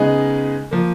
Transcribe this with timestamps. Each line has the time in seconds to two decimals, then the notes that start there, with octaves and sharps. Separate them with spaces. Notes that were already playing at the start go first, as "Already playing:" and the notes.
Already playing: C#3 G#3 B3 D#4 G#4
0.71 F3 A#3